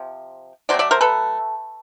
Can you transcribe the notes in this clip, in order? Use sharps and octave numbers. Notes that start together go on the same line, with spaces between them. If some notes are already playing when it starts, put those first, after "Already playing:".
Already playing: C3 F3
F#3 A3 C4 C5 D5
D5 E5
A#4 C5
A4 B4